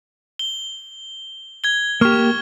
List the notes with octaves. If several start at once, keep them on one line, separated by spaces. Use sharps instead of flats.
G7
G#6 G7
A#3 G4 C#6 F6